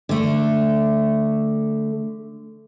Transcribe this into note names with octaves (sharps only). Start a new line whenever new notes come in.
D3 A3